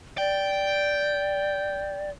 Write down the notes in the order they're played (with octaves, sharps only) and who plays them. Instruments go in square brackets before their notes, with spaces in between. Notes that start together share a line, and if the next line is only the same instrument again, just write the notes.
[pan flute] D5 [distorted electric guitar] G5